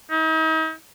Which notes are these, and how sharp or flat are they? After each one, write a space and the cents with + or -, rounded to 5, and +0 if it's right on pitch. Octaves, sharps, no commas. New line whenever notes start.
D#4 +40